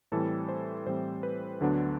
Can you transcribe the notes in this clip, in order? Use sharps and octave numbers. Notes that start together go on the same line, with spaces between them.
A2 E3 G3 C4 A4 A5
C5
A2 E3 G3 C4 C5
B4
D2 D3 F#3 B3 D4